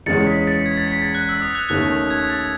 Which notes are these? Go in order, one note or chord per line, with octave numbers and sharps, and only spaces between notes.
E2 C#3 G#3 C#4 A6 C#7
B6
A6 C#7
G#6
A6
B6
A6
F#6
E6
D#6
F#6
D#2 D#3 A3 C#4 F#6
G#6
A6